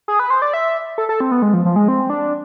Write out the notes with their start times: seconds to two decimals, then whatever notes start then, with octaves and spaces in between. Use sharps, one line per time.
0.08 G#4
0.19 B4
0.30 C5
0.42 D5
0.53 E5
0.98 A4
1.09 A4
1.20 C4
1.31 B3
1.42 G#3
1.54 F3
1.65 F3
1.76 G#3
1.88 C4
2.10 D4